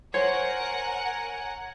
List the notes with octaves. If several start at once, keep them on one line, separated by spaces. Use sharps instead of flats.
A#4 C5 C#5 F#5 G#5